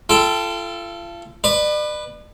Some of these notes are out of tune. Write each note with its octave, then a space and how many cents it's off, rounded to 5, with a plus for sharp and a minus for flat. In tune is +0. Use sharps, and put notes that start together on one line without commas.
F4 -35 A4 +0 G5 +0
B4 +0 D5 +40